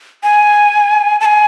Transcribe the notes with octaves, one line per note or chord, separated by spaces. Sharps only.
G#5
A5
G#5